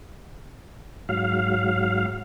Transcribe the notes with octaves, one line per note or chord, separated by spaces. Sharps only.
G#2 F#3 F5